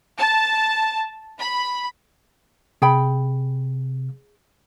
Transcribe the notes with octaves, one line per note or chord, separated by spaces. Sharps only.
A5
B5
C3 G#4 G5 B5